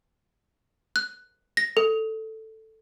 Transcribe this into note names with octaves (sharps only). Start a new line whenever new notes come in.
F#6
A#6
A4